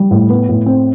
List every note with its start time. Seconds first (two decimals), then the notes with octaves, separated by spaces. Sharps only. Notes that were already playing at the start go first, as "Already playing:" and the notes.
Already playing: G3
0.11 A2
0.30 B3
0.49 A2
0.66 C4